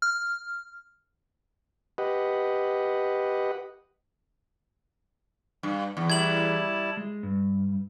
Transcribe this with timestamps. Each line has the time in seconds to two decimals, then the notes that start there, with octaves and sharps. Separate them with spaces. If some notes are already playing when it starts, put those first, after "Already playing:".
0.02 F6
1.98 G4 B4 D#5 F#5
5.63 G2
5.97 E2
6.10 G3 E4 A5 G#6 F#7
6.97 G#3
7.23 G2